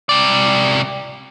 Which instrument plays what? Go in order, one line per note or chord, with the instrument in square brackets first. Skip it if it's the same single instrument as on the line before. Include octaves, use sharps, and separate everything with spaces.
[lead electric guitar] C3 D5